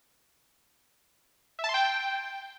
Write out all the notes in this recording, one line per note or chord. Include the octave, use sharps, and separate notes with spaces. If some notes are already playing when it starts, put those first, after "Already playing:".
E5
A5
C6
G5